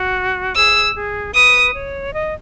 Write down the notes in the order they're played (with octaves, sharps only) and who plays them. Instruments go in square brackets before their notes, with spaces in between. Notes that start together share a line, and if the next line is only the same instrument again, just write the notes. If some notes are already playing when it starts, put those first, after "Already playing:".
Already playing: [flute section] F#4
[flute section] G#4 [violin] E6
[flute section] G#4
[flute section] B4 [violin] D#6
[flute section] C#5
D#5